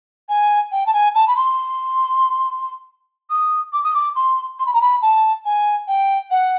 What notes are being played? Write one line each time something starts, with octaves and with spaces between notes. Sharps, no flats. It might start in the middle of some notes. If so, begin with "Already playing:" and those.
G#5
G5
A5
G#5
A5
B5
C6
D#6
D6
D#6
D6
C6
C6
B5
A#5
B5
A5
G#5
G5
F#5